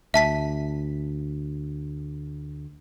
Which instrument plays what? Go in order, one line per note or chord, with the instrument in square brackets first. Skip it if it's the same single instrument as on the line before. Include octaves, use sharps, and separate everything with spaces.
[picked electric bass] D2 [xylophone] E5 A5 B6